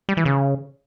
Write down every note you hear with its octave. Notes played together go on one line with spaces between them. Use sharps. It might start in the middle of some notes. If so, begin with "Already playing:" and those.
G3
E3
C#3